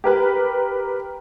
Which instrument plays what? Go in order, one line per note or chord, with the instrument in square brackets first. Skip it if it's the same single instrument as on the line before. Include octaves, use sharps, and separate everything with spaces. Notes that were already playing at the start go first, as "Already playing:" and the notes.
[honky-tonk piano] G4 A#4 B4